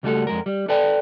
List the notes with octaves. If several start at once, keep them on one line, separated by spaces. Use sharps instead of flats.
C#2 G3 A3 F#4 A4
F2 G#3 A#4
G3
A4 B4 D5 G5 A5